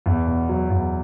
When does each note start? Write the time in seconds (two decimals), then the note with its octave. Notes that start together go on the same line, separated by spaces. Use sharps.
0.06 E2
0.27 B2
0.49 F#3
0.70 E2